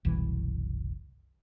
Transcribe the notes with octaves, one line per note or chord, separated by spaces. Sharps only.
F#1 C2 B2 E3